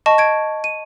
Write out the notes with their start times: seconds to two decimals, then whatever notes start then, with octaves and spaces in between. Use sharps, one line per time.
0.06 D#5 A5 C#6
0.18 G#6 D7
0.64 D#7